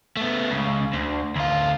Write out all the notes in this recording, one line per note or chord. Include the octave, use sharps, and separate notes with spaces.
A3 B3
C#2 C#3
D2
D2 F4